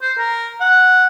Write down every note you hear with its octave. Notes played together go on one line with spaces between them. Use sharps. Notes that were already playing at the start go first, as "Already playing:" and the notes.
C5
A#4
F#5